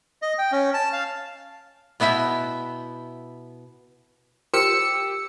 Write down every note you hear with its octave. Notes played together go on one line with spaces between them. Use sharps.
D#5
G5
C#4
A5
F5
B2 B3 E4 E5 G5
F4 G4 A#4 C5 E6 C#7